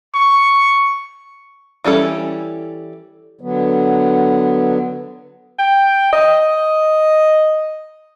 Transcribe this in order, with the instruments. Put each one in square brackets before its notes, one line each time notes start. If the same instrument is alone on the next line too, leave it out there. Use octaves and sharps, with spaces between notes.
[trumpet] C#6
[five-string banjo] E3 G3 C#4 A4
[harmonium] D3 F#3 B3
[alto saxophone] G5
D#5